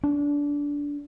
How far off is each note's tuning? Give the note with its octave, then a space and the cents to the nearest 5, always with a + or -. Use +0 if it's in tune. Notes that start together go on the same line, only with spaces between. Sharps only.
D4 -20